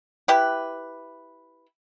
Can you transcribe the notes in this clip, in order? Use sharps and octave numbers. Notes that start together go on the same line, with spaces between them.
E4 G4 B4